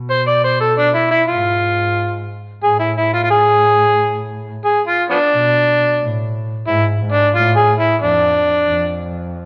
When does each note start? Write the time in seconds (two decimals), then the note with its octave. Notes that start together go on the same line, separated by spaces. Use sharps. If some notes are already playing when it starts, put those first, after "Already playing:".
Already playing: B2
0.10 C5
0.27 D5
0.44 C5
0.61 A4
0.78 D4
0.95 E4
1.11 E4
1.28 G#2 F4
2.63 A2 G#4
2.79 E4
2.97 E4
3.13 F4
3.24 F4
3.31 G#4
4.65 G#4
4.87 F4
5.10 F3 B3 D4
5.32 B2
6.00 A2
6.67 G#2 E4
7.01 G#2
7.12 D4
7.34 A2 F4
7.56 G#4
7.79 E4
8.01 F2 D4
8.69 F2